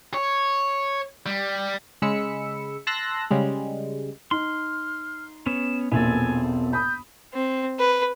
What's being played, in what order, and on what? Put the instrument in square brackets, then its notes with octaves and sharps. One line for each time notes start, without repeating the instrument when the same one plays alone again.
[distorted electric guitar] C#5
G3
[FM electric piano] C#3 G#3 B5 E6 C#7
A5 C6 E6 F#6 A#6
C#3 G3 G#3
[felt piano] D#4 [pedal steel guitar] C6 [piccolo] F6
[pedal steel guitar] B3 C#4 [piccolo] E7
[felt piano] E1 A#1 A#2 [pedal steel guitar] B3 C4 A4 [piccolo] G#5
[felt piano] B5 D#6 [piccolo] G6
[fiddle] C4
B4